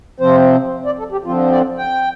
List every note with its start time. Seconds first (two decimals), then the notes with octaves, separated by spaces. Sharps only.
0.20 C3 F3 C4 C5
0.86 D5
0.99 A4
1.12 G4
1.25 D3 F3 C4 F4
1.51 D5
1.78 G5